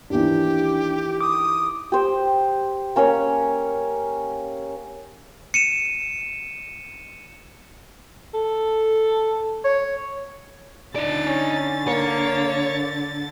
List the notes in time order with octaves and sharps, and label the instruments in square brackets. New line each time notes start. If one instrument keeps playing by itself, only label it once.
[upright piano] D#2 E3 [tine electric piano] D4 [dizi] G4
[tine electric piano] D6 [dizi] D#6
[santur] G4 C5
A#3 C#4 A#4 C#5
[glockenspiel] C#7 D#7 E7
[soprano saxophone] A4
C#5
[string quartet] D3 A6 [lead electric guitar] D#4 D5
[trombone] C#4
[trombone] A#3 [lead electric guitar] C#5